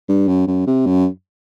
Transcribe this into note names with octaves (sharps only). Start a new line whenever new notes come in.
G2
F#2
F#2
C3
F#2